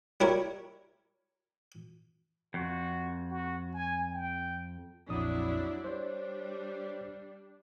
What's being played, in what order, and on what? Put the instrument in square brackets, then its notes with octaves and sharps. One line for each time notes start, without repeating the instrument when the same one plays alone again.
[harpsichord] G3 E4 A#4 C#5
[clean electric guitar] F2 [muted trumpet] F#4
[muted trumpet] F#4
G#5
G5
[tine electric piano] A#1 F2 D#6 [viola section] F#3 D4 E4
[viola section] G3 D4 [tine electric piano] C5 C#5